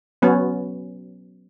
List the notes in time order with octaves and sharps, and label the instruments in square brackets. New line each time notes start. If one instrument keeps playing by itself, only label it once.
[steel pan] F#3 B3 C#4